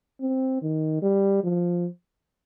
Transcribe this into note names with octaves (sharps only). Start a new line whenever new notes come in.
C4
D#3
G3
F3